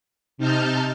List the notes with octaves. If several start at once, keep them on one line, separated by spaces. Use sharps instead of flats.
C3 D#4 A5 F6 G6